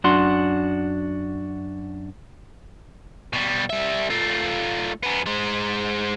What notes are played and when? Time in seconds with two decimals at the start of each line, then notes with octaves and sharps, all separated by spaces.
0.04 F#2 D4 F#4 C6
3.33 B2 G3
3.70 G3 E5
4.10 A3 F4
5.03 F#2 B3
5.26 G#3 C5